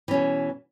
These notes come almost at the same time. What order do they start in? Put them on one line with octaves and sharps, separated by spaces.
E3 C#4 B2